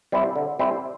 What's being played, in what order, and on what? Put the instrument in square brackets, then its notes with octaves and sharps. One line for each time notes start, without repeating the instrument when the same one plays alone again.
[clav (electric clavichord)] G3 C4 E4
D3
G3 C4 E4